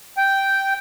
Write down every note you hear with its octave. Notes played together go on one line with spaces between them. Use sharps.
G5